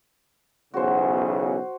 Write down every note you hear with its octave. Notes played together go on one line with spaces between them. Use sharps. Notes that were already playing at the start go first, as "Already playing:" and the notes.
B1 E2 C#3 F#4 C5